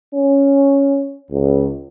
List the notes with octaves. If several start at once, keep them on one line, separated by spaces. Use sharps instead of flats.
C#4
C#2